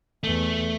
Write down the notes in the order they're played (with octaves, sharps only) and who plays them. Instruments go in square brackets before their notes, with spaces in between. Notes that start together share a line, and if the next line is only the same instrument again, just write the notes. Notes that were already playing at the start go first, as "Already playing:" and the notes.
[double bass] E2 [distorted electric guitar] A3